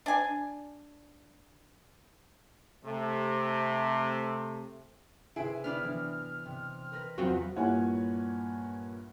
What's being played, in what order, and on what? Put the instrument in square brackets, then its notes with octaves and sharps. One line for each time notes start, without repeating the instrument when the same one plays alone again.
[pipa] D4 G#5
[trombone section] C3 A3
[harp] C3 B4 D7 [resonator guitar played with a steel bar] E4 G#4
[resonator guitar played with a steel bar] B3 D4 E4 [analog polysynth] F6
[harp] E3
C3
A#4 B4 A#6
[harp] E2 F#3 B4 [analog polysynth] C4 F4 F#4
[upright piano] G2 A#2 E4 C#5 F#5 G#5